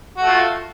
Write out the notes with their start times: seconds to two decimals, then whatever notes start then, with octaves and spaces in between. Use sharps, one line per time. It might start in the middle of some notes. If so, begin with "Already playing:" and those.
0.17 F#4
0.22 A3
0.27 F4